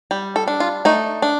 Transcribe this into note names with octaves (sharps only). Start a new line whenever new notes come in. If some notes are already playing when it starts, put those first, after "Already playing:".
G3
A4
D4
F4
A3 D#4
D4